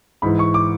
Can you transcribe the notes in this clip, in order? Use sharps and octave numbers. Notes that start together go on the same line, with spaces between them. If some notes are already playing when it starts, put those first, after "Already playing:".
G#2 E3 B5
C#6
D6